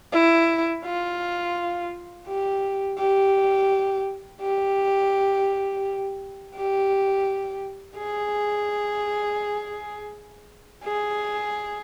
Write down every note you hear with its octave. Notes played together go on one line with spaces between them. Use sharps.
E4
F4
G4
G4
G4
G4
G#4
G#4